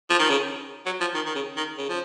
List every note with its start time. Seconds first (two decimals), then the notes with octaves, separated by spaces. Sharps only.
0.10 F3
0.19 D#3
0.30 C#3
0.86 F#3
1.01 F3
1.14 D#3
1.26 D#3
1.35 C#3
1.57 D#3
1.78 C#3
1.89 F3